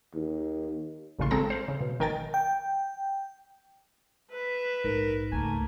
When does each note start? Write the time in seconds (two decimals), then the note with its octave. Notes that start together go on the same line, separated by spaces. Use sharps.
0.14 D#2
1.19 A1 A#2 C#3 F4 C6
1.31 G#3 C4 A4 A5 A#5 E7
1.50 C5 F5
1.68 C#3
1.81 B2
1.99 G#1 D#3 A#4 G5 G#5 A6
2.34 G5
4.31 B4 E5
4.84 A#1 G#2 A#4
5.32 C#2 A3 A#3 G#5